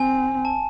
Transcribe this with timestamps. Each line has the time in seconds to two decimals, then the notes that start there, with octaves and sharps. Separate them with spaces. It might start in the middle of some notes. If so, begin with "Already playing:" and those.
Already playing: C4 G#5
0.45 A5